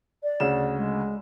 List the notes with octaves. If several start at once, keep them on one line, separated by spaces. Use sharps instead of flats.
D5
D2 C#3 E7
G#3